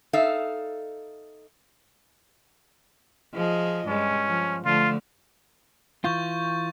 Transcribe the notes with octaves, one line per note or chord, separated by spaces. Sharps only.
D#4 A4 E5 F5
F3 G#4 D#5
G2 G#3 C#4
F3
D3 F3 A3 F4
E3 F4 C#6 G6 A6